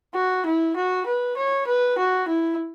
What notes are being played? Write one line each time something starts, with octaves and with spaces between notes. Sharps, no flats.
F#4
E4
F#4
B4
C#5
B4
F#4
E4